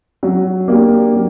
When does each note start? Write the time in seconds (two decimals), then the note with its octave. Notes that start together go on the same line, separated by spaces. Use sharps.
0.23 F#3
0.68 A#3 D4 G4
1.14 F#3